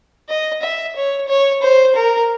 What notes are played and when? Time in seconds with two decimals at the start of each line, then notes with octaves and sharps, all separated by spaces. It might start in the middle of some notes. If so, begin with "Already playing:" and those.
0.29 D#5
0.62 E5
0.96 C#5
1.28 C#5
1.62 C5
1.96 A#4